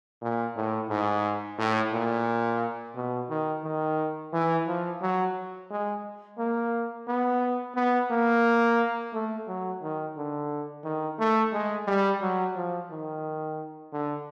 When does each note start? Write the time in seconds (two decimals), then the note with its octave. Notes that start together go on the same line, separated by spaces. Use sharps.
0.22 A#2
0.56 A2
0.90 G#2
1.58 A2
1.93 A#2
2.96 B2
3.30 D#3
3.64 D#3
4.33 E3
4.68 F3
5.02 F#3
5.71 G#3
6.38 A#3
7.08 B3
7.76 B3
8.10 A#3
9.13 A3
9.48 F#3
9.82 D#3
10.17 D3
10.84 D#3
11.19 A3
11.53 G#3
11.87 G3
12.22 F#3
12.56 F3
12.91 D#3
13.93 D3